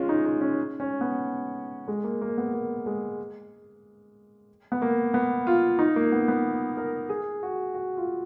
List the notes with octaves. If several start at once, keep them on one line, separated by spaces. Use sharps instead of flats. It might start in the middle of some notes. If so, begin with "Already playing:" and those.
Already playing: G#3 C#4 F4
D#4
D#4
C#4
C#4
B3
G#3
A#3
A#3
B3
A#3
G#3
B3
A#3
B3
F4
D#4
A#3
B3
B3
A#4
G#4
F#4
F#4
F4